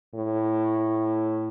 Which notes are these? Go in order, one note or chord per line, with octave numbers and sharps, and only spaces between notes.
A2